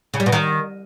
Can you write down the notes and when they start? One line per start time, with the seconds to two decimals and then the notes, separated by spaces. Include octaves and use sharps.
0.14 C#3
0.20 G3
0.26 B2
0.32 D#3